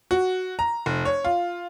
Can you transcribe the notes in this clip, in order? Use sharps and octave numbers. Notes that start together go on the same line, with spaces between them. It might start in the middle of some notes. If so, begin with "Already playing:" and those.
F#4
A#5
F1
C#5
F4